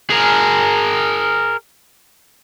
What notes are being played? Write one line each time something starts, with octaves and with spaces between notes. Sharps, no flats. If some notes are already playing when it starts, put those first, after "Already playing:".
G#4 A#4